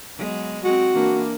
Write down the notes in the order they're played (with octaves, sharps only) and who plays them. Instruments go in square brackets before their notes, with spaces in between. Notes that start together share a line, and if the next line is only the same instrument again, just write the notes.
[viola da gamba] F#3 G#3 B3
[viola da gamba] G#3 C4 [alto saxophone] F#4
[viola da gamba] E3 A#3 D4